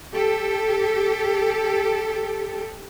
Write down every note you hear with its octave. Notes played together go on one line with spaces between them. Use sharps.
G4 A4